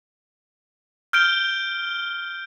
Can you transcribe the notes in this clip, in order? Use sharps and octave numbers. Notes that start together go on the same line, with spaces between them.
F6 G6 D7 G7